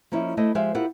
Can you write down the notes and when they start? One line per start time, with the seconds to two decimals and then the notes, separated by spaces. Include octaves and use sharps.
0.12 F3 A#3 C#4 D#4 E4
0.37 A3 E4 C5 D#5
0.55 F3 G#3 G4 C5 E5 F5
0.75 E4 F4 G4 A#4 C5 F#5